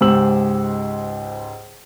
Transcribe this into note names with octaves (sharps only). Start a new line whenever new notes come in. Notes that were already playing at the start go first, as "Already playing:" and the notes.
C#2 G#2 G4 C5 E6 F#7